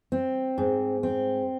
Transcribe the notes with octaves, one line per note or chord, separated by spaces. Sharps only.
C4
G#2
C4